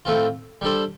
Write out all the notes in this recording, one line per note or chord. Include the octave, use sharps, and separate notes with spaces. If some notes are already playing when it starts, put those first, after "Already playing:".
A2 A3 C4 F4
G3 D4 A4 C5